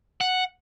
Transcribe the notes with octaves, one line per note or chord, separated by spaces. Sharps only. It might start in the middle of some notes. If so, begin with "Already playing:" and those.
F#5